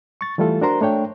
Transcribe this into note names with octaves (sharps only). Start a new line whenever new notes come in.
C#6 A6
E3 G3 A3 F4 A4
D4 F#4 A#4 C5 A#5 C6
A3 D4 C#5 G5